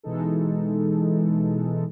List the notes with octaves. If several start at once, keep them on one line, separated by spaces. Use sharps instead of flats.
B2 E3 G#3 D#4 A4